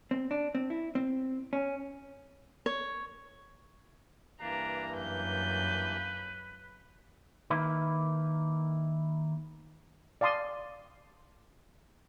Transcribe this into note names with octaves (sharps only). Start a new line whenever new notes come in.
C4
D4
C4
E4
C4
C#4
C#5
G2 E3 A#3 D4 A#5
F#2 B4 G6
D#3 A#3 E4 B4
D5 F5 A5 C6 D#6